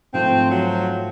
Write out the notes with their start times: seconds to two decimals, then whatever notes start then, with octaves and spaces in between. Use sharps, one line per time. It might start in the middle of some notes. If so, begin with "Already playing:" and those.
0.14 G#2 F3 A3 C4
0.51 F#3